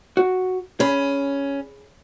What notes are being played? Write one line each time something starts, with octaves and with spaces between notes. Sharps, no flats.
F#4
C#4 G#4 B5